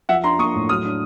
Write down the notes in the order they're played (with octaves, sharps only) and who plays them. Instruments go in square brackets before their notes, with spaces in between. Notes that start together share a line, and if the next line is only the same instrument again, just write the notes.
[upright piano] F3 [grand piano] E5 F#5
[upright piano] D4 [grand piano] A#5 C6
[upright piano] A#3 [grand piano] C#6 D#6
[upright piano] A2
[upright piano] F#3 [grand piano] D#6 F6
[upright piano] D4